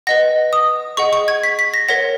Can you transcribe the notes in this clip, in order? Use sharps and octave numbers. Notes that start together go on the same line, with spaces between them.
B4 D#5 F#5 A#6
D#6
G#4 D#5 F#5 C#6
C#6
G#6
B6
B6
A#6
A#4 C#5 F#5 A#6